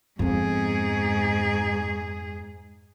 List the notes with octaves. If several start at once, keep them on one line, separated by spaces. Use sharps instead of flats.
F2 G#2 B3 G#4